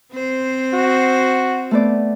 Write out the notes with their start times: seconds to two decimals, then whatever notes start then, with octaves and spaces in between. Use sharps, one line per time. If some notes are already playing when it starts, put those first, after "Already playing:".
0.12 C4 C5
0.74 F#4
1.71 A3 B3 D5